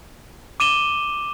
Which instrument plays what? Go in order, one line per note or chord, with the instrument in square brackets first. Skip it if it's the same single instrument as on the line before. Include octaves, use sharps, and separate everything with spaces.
[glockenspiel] D6 D#7 E7 G7